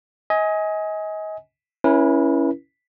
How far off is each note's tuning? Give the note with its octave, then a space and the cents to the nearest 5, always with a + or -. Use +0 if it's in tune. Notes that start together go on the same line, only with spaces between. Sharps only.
D#5 +30 G#5 +0
C#4 +0 E4 +0 B4 -45